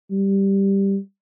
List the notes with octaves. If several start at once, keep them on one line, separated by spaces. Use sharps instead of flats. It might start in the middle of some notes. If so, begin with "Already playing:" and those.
G3